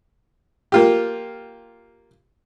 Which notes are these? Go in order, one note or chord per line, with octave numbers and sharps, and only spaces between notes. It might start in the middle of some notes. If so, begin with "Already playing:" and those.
A#3 F4 G4